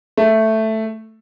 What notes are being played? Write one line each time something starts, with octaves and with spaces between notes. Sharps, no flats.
A3